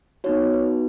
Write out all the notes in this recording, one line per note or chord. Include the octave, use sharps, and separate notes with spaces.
B3 D#4 F#4 C#5
B4